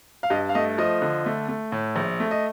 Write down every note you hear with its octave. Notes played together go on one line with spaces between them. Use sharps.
F5
G2 D#5
F5
A3 D#5
F3 D#5
D3
A3
A3
A2
A#1
A3
D#5